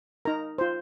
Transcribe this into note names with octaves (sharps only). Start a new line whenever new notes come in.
D#4 A#4 A#5
F4 C5